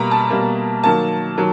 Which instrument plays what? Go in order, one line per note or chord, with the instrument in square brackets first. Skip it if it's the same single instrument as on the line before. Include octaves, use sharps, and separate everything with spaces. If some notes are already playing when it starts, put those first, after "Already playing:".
Already playing: [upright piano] B2 G3 A#3 A#5 B5
A5
B2 G3 A#3
D#3 F#3 A#3 A5
D#3 F#3